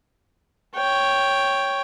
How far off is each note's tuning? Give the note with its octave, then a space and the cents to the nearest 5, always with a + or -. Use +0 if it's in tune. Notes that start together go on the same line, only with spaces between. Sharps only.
C#5 +0 G5 +0